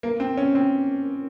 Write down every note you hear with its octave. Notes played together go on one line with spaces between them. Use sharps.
A#3
C4
C#4
C4